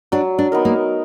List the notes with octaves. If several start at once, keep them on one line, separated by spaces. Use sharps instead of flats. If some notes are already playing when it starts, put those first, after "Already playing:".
F#3 D4
D4
B3 D#4 A#4
A#3